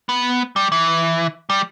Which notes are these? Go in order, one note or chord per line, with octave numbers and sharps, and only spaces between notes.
B3
G3
E3
G3